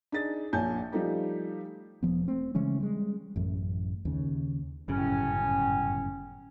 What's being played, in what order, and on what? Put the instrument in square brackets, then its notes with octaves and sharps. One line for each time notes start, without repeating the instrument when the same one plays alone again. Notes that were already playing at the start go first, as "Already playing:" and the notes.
[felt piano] D4 D#4 G#4 A6
A#1 A#2 C#5 G#5 A5 G6
F3 G3 A3 D#4 G4
[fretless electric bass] E1 F3 B3
A3 C4
C#3 E3 G#3 C#4
G3 G#3
A1 F#2
D#2 C#3
[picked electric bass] G1 F#2 C#3 [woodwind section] A2 C#4